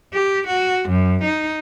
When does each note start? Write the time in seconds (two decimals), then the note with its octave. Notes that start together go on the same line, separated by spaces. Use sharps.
0.14 G4
0.48 F#4
0.89 F#2
1.24 D#4